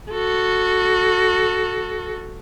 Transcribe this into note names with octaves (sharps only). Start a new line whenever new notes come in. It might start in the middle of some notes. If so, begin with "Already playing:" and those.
F#4 A4